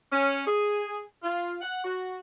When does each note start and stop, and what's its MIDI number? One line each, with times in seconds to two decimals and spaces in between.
0.11 0.45 61
0.46 1.01 68
1.22 1.55 65
1.61 1.80 78
1.84 2.18 66